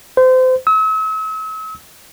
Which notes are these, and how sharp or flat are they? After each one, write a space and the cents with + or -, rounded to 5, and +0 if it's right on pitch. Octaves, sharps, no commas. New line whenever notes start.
C5 -30
E6 -40